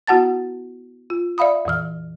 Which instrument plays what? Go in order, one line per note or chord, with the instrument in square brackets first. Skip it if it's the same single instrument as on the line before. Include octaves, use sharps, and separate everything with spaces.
[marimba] B3 E4 F#4 F#5 A5 A6
F4
D5 E5 F5 B5 D#6
F2 A#2 E3 F6